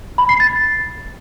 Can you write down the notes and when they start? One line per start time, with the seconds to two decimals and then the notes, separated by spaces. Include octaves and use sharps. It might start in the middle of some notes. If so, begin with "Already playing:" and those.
0.18 B5
0.29 C7
0.40 A6